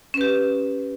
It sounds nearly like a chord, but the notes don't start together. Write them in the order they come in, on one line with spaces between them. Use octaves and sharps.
C#4 B4 G4